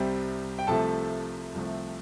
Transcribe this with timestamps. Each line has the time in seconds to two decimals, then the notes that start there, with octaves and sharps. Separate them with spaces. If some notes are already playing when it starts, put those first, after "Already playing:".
Already playing: C2 C3 G3 C4
0.59 G5
0.67 C2 C3 F3 A3 A4 A5
1.54 C2 C3 F3 A3